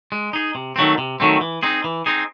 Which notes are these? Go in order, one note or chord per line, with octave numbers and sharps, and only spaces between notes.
G#3
D#4 G#4
C3
D#3 F#3 A3 C4
C3
D#3 F#3 A3 C4
E3
C4 D#4 G#4
E3
C4 D#4 G#4